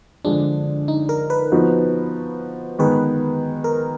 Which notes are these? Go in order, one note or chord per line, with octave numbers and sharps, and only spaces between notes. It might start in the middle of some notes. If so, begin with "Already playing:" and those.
D3 F3 G#3 D4
D#4
A#4
B4
F3 B3 D#4 F#4
D#3 G#3 B3 B4
A#4